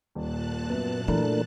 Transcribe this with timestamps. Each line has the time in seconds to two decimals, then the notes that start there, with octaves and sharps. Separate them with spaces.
0.15 D#1 A#2 A5 F#6
0.70 F#2 B3
1.08 E3 A3 D4 A#4